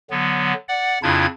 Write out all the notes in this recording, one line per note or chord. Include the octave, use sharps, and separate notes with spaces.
D3 F#3 B3
D5 F#5
F2 C#3 D4 E4 F4 G#6